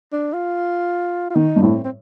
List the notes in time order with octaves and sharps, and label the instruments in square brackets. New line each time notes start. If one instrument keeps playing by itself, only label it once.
[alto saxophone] D4
F4
F4
[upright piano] D#3 [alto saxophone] D#4
[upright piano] G2
[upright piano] A2 [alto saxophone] C4
[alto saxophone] C4